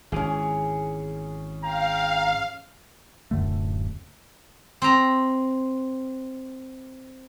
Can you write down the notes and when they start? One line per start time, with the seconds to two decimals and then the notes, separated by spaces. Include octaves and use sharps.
0.12 G#1 E3 C#4 G#4
1.62 F5 G5 A#5
3.31 D1 F#2 D3 A3
4.82 C4 A#5